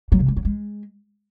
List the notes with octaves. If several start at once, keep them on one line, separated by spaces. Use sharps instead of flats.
F#3
C3
G3
F#3
G#3